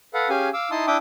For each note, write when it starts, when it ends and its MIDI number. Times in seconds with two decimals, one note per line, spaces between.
0.14 0.29 69
0.14 0.29 71
0.14 0.29 77
0.14 0.29 78
0.29 0.49 61
0.29 0.49 67
0.29 0.49 68
0.29 0.49 77
0.29 0.49 80
0.53 0.70 77
0.53 0.70 86
0.53 0.70 88
0.71 0.86 63
0.71 0.86 64
0.71 0.86 81
0.71 0.86 84
0.71 0.86 87
0.87 0.97 62
0.87 0.97 64
0.87 0.97 76
0.87 0.97 79
0.87 0.97 86
0.87 0.97 87